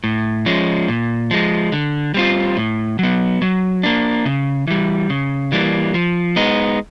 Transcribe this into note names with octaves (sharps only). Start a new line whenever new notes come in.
A2
F3 G#3 C#4
A#2
F3 G#3
D3
G3 C4 F4
A2
F#3 B3
F#3
A#3 D4
C#3
E3 G3
C#3
E3 G3 A#3
F3
G#3 B3 D#4